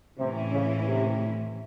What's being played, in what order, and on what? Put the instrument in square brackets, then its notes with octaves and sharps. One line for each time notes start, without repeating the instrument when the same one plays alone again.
[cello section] A2 E3 A3 C#4 E4 [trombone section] C3
[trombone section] C#3
C3